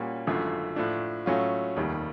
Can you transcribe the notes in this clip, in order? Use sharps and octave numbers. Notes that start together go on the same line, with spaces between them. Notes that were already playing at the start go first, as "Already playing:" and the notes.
Already playing: A#2 G3 A#3 C#4 F#4
G#1 F#2 D3 F3 A3
A2 F3 A3 D4
A2 F#3 A3 C#4 F4
F1 D#2 D#3 G3